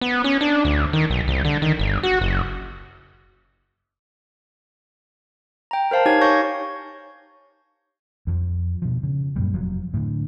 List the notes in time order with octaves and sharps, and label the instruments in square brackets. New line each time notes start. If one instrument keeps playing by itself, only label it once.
[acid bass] B3
C#4
D4
D2
D#3
B1
C2
D3
D#3
G1
F#4
F#1
[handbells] G5 A#5
A#4 C5 F5 A5
D#4 G4 C#5 G#5 G#6
C#5 F5 C#6 G6 A#6
[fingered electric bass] F2 F3
B2 F3
C#3
F#2 A#2 G3
F1 F3 F#3
A2 D3